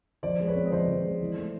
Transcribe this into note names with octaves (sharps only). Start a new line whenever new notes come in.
F3 C5 D5
G#3
B4 C#5
C4
D#5
F3 C5 D5
F3
G#3
E3
A3